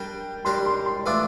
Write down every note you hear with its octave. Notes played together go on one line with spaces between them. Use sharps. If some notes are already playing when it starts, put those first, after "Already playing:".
Already playing: G3 D4 G4 A#4 G5
G3 D4 G4 A#4 C6
C6
C6
E3 A3 D4 F4 D6